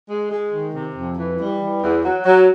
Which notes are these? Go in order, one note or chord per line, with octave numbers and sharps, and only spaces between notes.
G#3
G#3
D#3
C3
F2
E3
G3
E3
E2
F#3
F#3